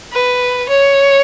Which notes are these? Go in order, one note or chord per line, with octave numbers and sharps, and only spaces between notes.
B4
C#5